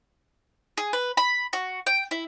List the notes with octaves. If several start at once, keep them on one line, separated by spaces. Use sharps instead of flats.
G#4
B4
B5
F#4
G5
E4